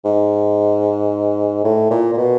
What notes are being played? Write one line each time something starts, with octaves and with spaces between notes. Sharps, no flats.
G#2
A2
A#2
A#2
B2